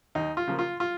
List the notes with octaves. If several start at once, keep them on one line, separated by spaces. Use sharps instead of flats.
D#2 D#4
F4
C#3 F3 A#3
F4
F4